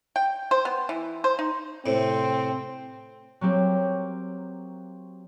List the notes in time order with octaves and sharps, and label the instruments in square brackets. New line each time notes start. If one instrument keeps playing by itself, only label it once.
[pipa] G5
C5
B3
E3
C5
D#4
[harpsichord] A2 C3 [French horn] C4
[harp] F#3 A#3 C4 G4